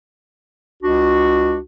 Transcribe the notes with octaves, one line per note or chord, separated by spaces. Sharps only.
C#2 D4 F#4